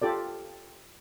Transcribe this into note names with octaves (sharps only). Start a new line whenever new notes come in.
F4 G4 A4 D5